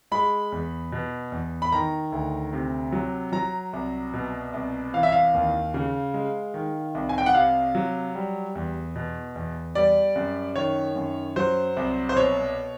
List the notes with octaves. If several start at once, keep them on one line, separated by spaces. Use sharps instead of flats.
G#3 B5
E2
B2
E2
B5
D#3 A#5
D2
C3
F#3
F#3 A#5
C2
B2
C2
E3 F5
E5
F5
D#2
C#3
G#3
D#3
C2
G#5
G5
F#5
C3 F5
F#3
G3
E2
B2
E2
G3 D5
F#2
D#3 C#5
F#2
F#3 C5
C2
C5
B2 C#5